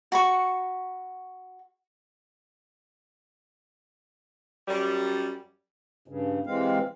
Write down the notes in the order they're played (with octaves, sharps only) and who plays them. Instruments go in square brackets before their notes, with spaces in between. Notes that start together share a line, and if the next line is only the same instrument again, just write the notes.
[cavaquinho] F#4 B5 C#6
[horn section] F#2 G3
[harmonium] G2 C#3
C3 E3 G#3 C4 F5